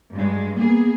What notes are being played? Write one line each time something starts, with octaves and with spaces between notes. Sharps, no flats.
G2 F#3 G#3
A#3 B3 G#4